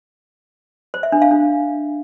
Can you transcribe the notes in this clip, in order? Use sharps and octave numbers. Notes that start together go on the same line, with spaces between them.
C5
E5
D4
F5
D4